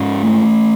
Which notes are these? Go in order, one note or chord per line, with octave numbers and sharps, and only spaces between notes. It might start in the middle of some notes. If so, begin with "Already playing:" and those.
Already playing: G#2 C#4
A3